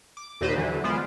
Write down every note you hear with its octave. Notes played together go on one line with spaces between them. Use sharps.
D6
D#2 A#2 D#4 B4 C5 D#5
D3 E3 F#3
G#3 B3 F4 C5 D5